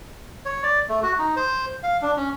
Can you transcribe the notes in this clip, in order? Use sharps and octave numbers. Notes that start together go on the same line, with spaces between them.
C#5
D5
A3
F#4
D#4
C5
F5
D4
C#4